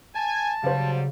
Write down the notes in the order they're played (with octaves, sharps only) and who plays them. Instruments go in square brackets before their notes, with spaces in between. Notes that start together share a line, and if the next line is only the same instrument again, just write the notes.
[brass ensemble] G#5 [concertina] A5
[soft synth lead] C#3 [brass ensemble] F#3 G3 [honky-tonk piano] C5 F5